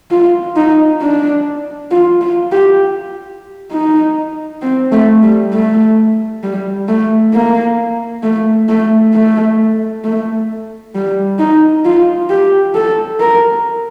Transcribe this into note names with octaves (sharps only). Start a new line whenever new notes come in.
F4
D#4
D4
F4
F4
G4
D#4
C4
A3
G3
A3
G3
A3
A#3
A3
A3
A3
A3
G3
D#4
F4
G4
A4
A#4